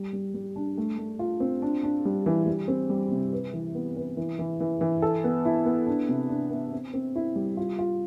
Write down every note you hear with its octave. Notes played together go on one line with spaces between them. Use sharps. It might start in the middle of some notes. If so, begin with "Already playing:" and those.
Already playing: G3
G3
G3
D4
A3
A3
F4
C4
D4
D4
G3
E3
G3
C4
G3
C3
B4
E3
B3
B4
E3
E3
E3
E3
A4
B3
E4
B3
D4
C3
D4
B3
C4
C4
E4
G3
F4
F4